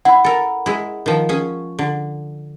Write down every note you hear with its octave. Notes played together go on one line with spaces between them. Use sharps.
E4 F#5 B5
A4 A#4
G#3 E4
D#3 F3
C#4 G#4
D3